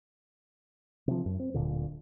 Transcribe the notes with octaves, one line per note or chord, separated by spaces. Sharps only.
C3 F3
F#2
C4
D1 G#1 A#2 D3